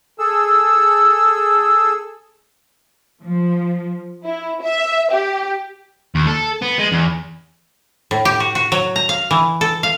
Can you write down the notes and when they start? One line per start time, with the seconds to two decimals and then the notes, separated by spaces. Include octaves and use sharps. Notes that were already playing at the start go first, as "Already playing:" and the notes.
0.19 G#4 A4 E6
3.23 F3
4.24 E4
4.62 E5
5.11 G4
6.15 D#2
6.27 A4
6.62 B3
6.80 G#3
6.92 E2
8.11 A2
8.25 G4
8.40 F#4
8.55 F#4
8.72 F#3
8.96 A#5
9.09 F5
9.31 E3
9.61 A4
9.83 F5